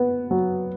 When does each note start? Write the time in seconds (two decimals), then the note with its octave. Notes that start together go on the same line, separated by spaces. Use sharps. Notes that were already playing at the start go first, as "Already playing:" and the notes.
Already playing: B3
0.31 F#3